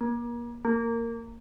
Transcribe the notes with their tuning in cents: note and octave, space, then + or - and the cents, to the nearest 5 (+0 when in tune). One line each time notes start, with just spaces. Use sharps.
A#3 +35
A#3 -15